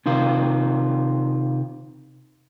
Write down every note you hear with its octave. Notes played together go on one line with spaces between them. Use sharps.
C3 D#3 F4